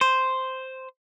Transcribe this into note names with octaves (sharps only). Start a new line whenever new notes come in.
C5